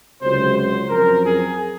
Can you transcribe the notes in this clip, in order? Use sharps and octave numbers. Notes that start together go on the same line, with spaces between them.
C#2 C3 F#3 C5
C5
F#2 F3 C4 A#4
G#4